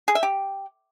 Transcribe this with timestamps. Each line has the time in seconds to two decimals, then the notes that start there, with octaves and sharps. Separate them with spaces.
0.08 G#4
0.15 E5
0.23 G4